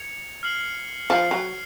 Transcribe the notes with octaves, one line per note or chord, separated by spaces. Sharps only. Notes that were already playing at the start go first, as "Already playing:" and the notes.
Already playing: G#6 C#7 F7
F6 C7 F#7
F3 F6 C7 F#7
F#3